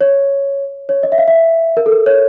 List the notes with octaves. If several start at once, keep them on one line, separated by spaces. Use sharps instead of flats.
C#5
C#5
D#5
E5
F5
E5
A#4
A4
A#4
C#5